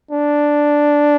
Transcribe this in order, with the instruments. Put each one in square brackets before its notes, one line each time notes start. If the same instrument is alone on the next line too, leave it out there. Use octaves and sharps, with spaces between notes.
[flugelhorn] D4